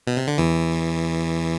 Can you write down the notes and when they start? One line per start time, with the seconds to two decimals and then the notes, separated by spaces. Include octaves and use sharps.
0.07 B2
0.17 C3
0.28 D3
0.38 E2 E3